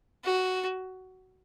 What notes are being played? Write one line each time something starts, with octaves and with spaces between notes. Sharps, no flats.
F#4